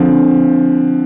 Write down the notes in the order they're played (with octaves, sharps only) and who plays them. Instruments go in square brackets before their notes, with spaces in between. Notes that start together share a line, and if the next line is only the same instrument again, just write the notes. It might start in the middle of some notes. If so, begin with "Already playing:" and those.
Already playing: [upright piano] D3 F3 C4